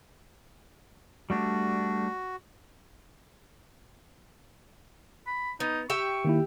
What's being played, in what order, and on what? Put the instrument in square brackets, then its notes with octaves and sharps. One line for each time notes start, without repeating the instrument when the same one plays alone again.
[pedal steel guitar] G3 A3 D4 [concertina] F#4
[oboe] B5
[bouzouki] B3 [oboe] D#4
[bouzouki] G4 E5 G5 [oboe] C#6
[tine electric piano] D#3 A#3 E4